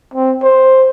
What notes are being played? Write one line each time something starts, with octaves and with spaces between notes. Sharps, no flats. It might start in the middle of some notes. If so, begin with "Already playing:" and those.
C4
C5